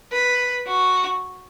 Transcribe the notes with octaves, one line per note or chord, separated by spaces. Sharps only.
B4
F#4